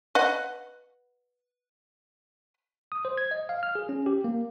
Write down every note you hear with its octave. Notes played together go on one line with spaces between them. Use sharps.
B4 D#5 F#5
D#6
C5
G#6
D#5
F5
F6
G#4
C#4
G4
A#3